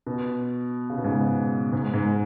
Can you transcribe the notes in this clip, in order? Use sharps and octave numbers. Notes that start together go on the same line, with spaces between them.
B2
C#3
B2
G#2
B2
G#2
G#2